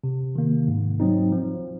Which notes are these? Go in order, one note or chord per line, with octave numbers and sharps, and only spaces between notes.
C3
D#3 A#3
G#2
F#3 C4 D#4
F3